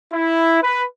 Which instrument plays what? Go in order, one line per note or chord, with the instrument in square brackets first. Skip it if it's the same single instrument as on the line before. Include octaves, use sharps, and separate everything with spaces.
[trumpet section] E4
B4